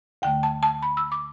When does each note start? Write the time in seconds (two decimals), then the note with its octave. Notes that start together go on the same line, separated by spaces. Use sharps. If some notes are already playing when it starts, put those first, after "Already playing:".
0.22 D2 D3 A3 G5
0.43 A5
0.63 A5
0.82 B5
0.97 E6
1.12 D6